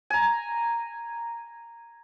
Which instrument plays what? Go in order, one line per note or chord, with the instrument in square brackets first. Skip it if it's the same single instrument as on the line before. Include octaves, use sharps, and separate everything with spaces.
[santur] G#5 A#5